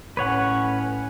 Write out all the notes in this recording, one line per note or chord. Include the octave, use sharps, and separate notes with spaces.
A2 C#4 B4 C#5 F#5